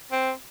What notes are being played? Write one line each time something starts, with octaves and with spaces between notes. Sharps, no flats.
C4